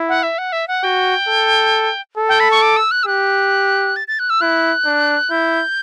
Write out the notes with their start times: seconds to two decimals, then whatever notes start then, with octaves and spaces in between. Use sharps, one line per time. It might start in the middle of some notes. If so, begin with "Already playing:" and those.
Already playing: E4
0.09 F#5
0.23 E5
0.38 F#5
0.52 E5
0.68 F#5
0.83 F#4 G5
1.28 A4
2.18 A4
2.29 G5
2.40 B5
2.51 C#6
2.62 D6
2.77 E6
2.91 F#6
3.03 E6
3.07 G4 F#6
3.96 A6
4.08 A6
4.19 F#6
4.30 E6
4.41 E4 F#6
4.85 D4
5.31 E4 G6